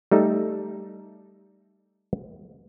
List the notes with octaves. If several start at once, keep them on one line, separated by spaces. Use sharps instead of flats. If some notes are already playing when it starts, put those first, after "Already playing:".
G3 A3 D#4 A4